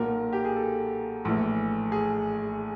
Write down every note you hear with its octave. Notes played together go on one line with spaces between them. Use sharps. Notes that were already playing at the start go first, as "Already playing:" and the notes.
Already playing: B1 A#2 A#4
G4
G#4
A4
A#1 A2 E3
G#4